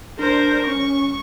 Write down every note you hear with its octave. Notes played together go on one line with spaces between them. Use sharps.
D4 A#4 C5
C#4 C#6